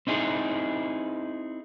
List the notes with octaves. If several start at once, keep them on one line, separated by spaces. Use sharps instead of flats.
C4 D#4 E4 G#4